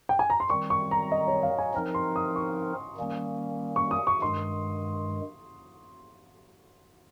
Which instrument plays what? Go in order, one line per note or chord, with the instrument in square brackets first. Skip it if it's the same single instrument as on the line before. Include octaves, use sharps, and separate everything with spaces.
[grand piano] G5
G#5
A#5
C6
[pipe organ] D#3 G3 C4 [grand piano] C#6
[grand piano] C#6
A#5
D#5
C#5
F5
G#5
[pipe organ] F3 C4 D#4 A#4 [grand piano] A#5
[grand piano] C6
D#6
C#6
[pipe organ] D#3 G3 A#3 C#4
[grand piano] C#6
D#6
C#6
[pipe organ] G2 D#3 G#3 [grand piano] C6